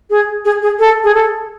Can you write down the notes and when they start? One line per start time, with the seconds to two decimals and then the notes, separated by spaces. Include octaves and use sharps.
0.10 G#4
0.45 G#4
0.62 G#4
0.79 A4
1.04 G#4
1.14 A4